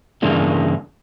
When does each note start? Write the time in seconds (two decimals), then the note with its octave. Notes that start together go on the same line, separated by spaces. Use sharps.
0.22 G2 C#3 E3 A#3 D4